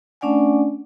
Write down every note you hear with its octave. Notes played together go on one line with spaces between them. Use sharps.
A3 C#4 D4 D5 F#5 G#5